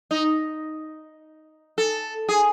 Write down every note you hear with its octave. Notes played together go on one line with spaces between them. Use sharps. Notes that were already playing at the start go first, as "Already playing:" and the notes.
D#4
A4
G#4